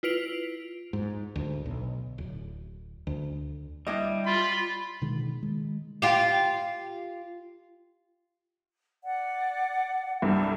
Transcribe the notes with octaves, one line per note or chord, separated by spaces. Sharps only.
E4 F4 B4 D7 F7
G#2
D2
B1
D1
D2
G3 D4 E4 D#5
F4 B5
B2 D3 D#3 G#3
D#3 G#3
F4 G4
D5 F#5
C2 G2 A4 D5 G#5